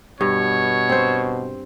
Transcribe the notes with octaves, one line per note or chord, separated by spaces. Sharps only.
G2 B2 C#5
C4 C5